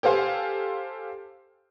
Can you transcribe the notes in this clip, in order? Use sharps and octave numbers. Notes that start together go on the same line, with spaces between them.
G4 A4 C5 F5 G#5 C6